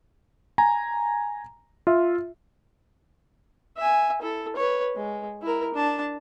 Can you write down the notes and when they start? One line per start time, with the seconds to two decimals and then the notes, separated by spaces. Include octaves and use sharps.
0.58 G#5 A#5
1.87 F4 E5
3.77 E5 G#5
4.22 E4 A4
4.56 B4 C#5
4.96 G#3
5.42 E4 A#4
5.74 D4 A5